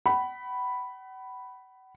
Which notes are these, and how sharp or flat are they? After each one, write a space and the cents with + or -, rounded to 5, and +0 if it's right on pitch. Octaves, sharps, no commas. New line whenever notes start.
F#5 +40 B5 +0